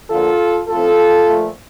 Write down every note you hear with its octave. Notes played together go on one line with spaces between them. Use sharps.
D3 F3 A#3 F4 A4
A2 F3 C4 F4 A4
A#2 F3 A3